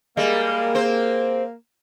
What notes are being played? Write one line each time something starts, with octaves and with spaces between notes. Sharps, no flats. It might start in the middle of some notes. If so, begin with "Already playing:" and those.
G3 G#3 A#3
C4 C5